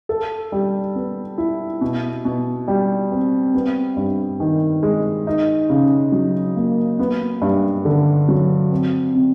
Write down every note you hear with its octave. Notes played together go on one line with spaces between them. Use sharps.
A4
G3
B3
E4
B2
B2
G3
C4
B3
G2
D#3
G#3
D#4
C#3
F#3
A#3
B3
G2
D3
F#3
C4
C3